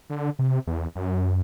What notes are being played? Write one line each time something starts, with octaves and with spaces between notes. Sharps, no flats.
D3
C3
E2
F#2